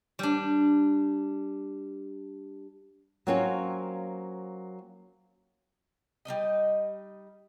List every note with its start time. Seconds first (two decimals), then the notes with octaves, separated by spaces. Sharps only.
0.19 G3 D4
3.27 F#3 A#3 C4 C#4 F4 C#5
6.25 G3 A#3 D#4 D#5